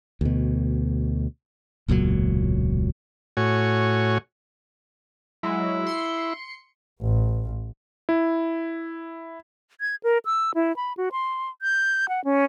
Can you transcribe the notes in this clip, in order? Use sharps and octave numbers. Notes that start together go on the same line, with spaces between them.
D2 B2
E1 C#2 A#2 F#3
A2 F#4 C#5 G#5
F#3 G#3 E4
C6 C#7
A1
E4
G#6
A#4
E6
E4
B5
F#4
C6
G6
F#5
C#4